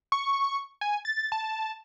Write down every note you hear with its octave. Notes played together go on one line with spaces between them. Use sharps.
C#6
G#5
A6
A5